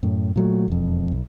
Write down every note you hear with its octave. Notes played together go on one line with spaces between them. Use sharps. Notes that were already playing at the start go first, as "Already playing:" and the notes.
F#2 A2
A#2 F#3 A3
E1 F2
B1